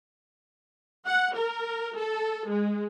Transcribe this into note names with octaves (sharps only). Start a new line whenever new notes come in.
F#5
A#4
A4
G#3